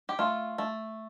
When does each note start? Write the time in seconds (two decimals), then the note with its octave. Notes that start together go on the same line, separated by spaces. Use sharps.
0.09 G4
0.19 A3 F4
0.58 A3